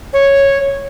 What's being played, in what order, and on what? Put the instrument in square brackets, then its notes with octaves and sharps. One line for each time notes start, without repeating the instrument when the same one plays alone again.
[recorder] C#5